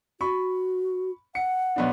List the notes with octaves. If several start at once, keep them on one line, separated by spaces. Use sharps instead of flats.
F#4 B5 C#6
F#5 C#7
B1 B3 D4